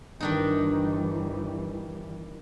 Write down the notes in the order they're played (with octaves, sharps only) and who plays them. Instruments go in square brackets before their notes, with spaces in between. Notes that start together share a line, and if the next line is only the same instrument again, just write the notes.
[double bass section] G1 E3 G3 [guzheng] D#3 D4 D#4